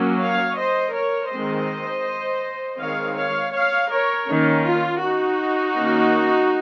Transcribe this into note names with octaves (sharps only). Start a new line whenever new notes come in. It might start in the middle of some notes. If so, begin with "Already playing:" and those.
Already playing: F#3 A#3 C#4
C#5 F5
C5 D#5
A#4 C#5
D#3 G#3 C4 C5 D#5
D#3 G#3 C4 C#5 F5
C#5 F5
C#5 F5
A#4 C#5
D#3 A#3 C#4
F4
D#4 F#4
D#3 A#3 C#4